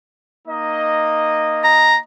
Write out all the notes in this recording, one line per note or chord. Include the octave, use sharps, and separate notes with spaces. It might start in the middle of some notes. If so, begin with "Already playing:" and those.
A#3 D#4 D#5
A#5